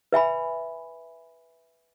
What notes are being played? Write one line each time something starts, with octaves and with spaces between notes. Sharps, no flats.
B4 E5 G#5 B5